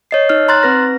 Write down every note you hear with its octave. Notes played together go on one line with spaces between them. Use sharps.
C#5 D#5 C7
D#4 C#5 F6
A#5 C6 F#6 A6
C4 B4 A#6